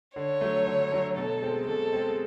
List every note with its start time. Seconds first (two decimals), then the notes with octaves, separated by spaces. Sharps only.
0.16 D3 C#5
0.41 F#3 A3
0.67 D3
0.92 F#3 A3
1.17 B2 A4
1.42 G#3 C4
1.67 B2 A4
1.93 G#3 C4